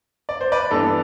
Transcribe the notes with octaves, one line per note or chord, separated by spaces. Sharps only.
D5
C5
B4 D5
G2 E3 B3 D4 A4